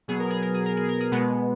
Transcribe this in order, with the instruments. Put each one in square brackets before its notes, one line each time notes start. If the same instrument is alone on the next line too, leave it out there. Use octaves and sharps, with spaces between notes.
[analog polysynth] B2 F#3 B3 G#4
A#4
G#4
A#4
G#4
A#4
G#4
A#4
G#4
B2 G#3 B3